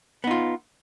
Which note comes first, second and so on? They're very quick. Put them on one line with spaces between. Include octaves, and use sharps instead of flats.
B3 D#4 F4